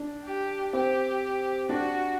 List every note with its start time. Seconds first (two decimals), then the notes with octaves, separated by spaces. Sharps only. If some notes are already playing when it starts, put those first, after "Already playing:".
Already playing: D4
0.24 G4
0.73 C4 G4
1.69 D4 F#4